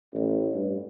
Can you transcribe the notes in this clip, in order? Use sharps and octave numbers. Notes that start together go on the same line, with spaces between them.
A1
G2